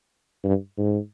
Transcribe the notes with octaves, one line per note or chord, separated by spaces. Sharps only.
G2
G#2